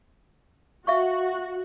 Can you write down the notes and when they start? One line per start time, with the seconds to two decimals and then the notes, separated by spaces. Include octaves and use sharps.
0.87 F#4 E5 F5 C#6